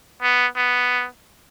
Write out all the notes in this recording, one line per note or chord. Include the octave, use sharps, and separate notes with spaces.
B3
B3